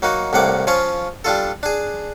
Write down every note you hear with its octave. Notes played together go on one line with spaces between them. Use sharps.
F#3 A#3 D#4 F#4
C2 A2 A#3 F#5 D6
F3 C#4 F4 C#5
G3 D4 F4 A4
D4 G#4